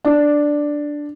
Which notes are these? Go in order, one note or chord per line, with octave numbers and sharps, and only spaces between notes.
D4